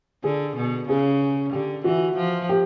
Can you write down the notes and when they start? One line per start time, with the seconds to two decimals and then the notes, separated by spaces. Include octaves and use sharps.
0.24 D3 G#4
0.56 B2
0.88 C#3 G#4
1.52 D3 G4
1.84 E3 F#4
2.16 F3
2.49 G4